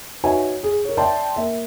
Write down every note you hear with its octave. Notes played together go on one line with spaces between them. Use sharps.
D#4 F#4 B4 C#5 E5 G#5
G#4
A#4 C#5
D5 E5 G5 A5 C6
A#3 E5